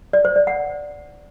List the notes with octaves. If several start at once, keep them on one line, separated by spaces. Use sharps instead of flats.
D5
C5
D5
F#5